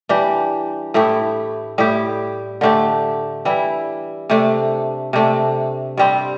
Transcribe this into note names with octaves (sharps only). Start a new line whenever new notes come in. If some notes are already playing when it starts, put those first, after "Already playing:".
E3 G3 D4 G4
A2 A3 E4 G4
A2 G3 E4 G4
D3 A3 D4 G4
E3 G3 E4
C3 A3 D4
C3 A3 D4
G2 G3 C4